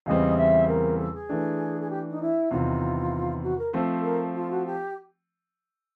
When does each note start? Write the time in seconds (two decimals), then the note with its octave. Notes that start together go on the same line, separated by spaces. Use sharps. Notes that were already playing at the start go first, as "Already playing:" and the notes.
0.06 E2 C#3 E3 G3 C4 D#5
0.37 E5
0.67 A#4
0.98 A4
1.14 G#4
1.29 E3 A3 D4
1.81 G#4
1.90 G4
2.10 D#4
2.21 E4
2.51 E2 C3 D#3 F4
3.43 F#4
3.58 A#4
3.73 F3 A3 C4 A4
4.03 A#4
4.34 F4
4.50 F#4
4.66 G4